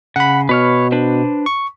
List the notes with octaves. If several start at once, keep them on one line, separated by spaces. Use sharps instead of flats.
C#3 F#5 B5
B2 B4 C#5 F6
D4 B4 C5
C#6